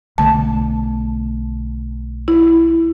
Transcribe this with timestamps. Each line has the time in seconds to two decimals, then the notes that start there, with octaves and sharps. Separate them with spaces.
0.18 B1 D3 A3 A5
2.28 E4